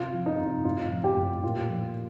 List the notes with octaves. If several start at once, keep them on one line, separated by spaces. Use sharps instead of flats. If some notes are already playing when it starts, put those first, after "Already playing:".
Already playing: C3 F4
F3
D#4
C3
A2 F4
F3
G4
A2
A#2 F4
F3